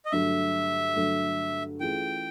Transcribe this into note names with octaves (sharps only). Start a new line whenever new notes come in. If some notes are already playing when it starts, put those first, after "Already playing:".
D#5
G2 D3 F#3 A3 E5
G2 D3 F#3 A3
E3 A3 C#4 F4 G#4 G5